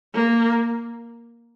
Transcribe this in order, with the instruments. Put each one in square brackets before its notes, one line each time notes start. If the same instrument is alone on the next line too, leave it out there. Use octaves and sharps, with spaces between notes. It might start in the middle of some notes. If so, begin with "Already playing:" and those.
[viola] A#3